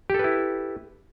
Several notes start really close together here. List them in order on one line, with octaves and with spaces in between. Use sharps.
G4 A4 B4 E4